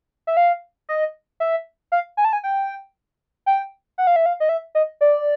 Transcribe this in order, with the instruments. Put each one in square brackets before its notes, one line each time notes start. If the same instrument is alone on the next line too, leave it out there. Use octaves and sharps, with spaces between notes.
[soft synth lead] E5
F5
D#5
E5
F5
G#5
A5
G#5
G5
G5
F#5
F5
E5
F5
D#5
E5
D#5
D5